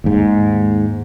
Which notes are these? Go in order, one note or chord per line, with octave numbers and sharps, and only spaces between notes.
D#2 G#2